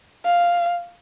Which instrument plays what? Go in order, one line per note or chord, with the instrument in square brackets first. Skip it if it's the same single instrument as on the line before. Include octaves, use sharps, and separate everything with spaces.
[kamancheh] F5